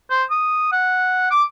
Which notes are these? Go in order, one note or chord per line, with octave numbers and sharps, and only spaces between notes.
C5
D#6
F#5
D6